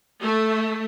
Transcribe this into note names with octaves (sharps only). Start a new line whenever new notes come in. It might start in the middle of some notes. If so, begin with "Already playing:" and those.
A3